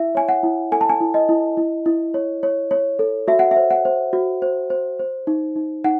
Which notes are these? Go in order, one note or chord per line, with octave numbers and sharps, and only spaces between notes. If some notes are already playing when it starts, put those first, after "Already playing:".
Already playing: E4 E5
C#5 G#5
F#5
E4
A4 G#5
A5
G#5
E4
D#5
E4
E4
E4
C#5
C#5
C#5
A4
F#4 E5
F#5
E5
C5
F#5
C5
F#4
C5
C5
C5
D#4
D#4
D#4 F#5